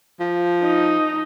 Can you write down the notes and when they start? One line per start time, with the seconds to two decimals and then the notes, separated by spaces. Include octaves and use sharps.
0.20 F3
0.63 D#4